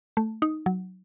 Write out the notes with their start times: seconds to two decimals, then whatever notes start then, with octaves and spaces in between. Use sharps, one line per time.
0.17 A3
0.42 D#4
0.66 F#3